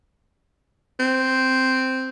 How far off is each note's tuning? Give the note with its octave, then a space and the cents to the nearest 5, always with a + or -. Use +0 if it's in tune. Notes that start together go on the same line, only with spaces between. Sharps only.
C4 -5